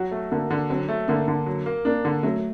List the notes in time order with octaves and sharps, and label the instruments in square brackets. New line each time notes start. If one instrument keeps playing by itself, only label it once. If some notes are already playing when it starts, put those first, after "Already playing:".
Already playing: [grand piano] F#3 [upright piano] F#4
[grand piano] A3
[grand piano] D3 [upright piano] A#3
[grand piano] D3
[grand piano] F#3 [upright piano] C4
[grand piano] A3
[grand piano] D3 [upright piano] A#3
[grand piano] D3
F#3
A#3
[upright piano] A#3 [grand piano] D4
[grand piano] D3
[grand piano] F#3 [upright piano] A3